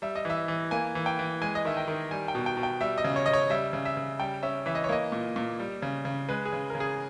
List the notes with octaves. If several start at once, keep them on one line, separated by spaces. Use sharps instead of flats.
G3 E5
D#5
E3 E5
E3
A#3 G#5
E3
G5
E3
G#3 G#5
D#5
D#3 E5
G5
D#3
G3 G#5
G5
B2
G5
B2
G5
G3 E5
D#5
C#3
C#5
C#3 D#5
C#5
G3 E5
C#3
E5
C#3
G3 G5
C#4 E5
E3 E5
D#5
C#5
A#3 D#5
A#2
A#2
G3
C#3
C#3
G#3 B4
G#4
C#3
C#3 A#4
G#4